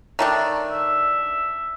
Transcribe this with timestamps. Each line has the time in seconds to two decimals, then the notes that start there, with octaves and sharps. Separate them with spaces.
0.19 D#3 A3 D4
0.71 E5